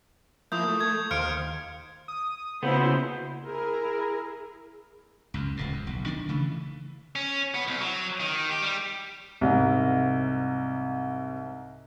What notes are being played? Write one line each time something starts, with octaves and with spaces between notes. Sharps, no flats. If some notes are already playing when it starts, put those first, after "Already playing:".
F3 A#3 E4 D#6 G6
A3
G#6
D#2 C5 F5 F6 C#7 D7
D#6
A#2 C#3 B3 E4 C5
E4 G#4 A#4
C#2 F#2
D1 C#2 A2
F#2
B1
D#3 D4
C#3 E3 A3
C#4
B3
C2
F#3
D#3
G4
G3
C2 G#2